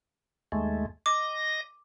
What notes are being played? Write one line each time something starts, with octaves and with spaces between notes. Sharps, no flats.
D#2 G#3 A3
D#5 D6 A#6